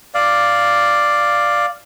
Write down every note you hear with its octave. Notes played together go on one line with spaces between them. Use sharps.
D5 F5